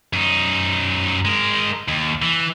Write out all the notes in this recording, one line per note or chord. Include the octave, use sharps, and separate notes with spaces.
F#2 D#4
G#3 A#4
D#2
E3